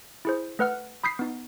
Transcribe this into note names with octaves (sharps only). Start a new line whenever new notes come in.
E4 G#4 C5
A3 B4 F#5 F6
B5 D#6 G6 B6 C7
B3 D#4